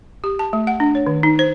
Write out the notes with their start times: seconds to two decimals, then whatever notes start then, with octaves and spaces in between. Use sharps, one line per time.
0.24 G4
0.39 A5
0.53 A3
0.67 F#5
0.80 D4
0.95 C#5
1.07 D#3
1.23 D#4
1.39 C5